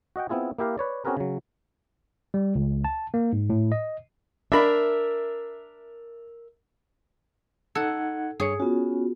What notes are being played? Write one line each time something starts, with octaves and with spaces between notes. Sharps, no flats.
F#4 D#5 F#5 G5
B3 C4 E4 F4 G#4
A#3 E4 G4 A#4 F5
B4 C#5 D5
C4 C#4 F#4 G#4 A#4 B4
C#3 F#3
G3
C#2
A5
A#3
G#2
A2
D#5
D4 A#4 E5 B5
D#4 A4 F#5 G#6
G2 G#4 C#5 C#7
B3 C#4 F4 F#4